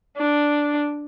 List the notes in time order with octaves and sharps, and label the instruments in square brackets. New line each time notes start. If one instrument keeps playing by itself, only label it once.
[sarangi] D4